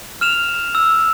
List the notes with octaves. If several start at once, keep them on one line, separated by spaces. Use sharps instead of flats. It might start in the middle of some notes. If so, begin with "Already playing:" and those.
F6 E7 F7
E6